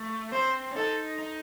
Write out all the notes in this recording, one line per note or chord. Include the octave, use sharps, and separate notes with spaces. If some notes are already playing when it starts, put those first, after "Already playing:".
Already playing: A3
C4 C5
C#4
D#4 A4
D#4